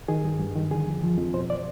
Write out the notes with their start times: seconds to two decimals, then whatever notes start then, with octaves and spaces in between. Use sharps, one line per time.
0.08 D#3 G#4
0.24 G2
0.39 G2
0.55 D#3
0.71 D3 G#4
0.87 F2
1.03 F3
1.18 F2
1.34 B2 C5
1.50 D5